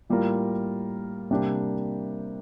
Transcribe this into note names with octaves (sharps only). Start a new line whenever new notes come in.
A2 G3 A#3 F4 A#4
C3 G3 A#3 D4 G4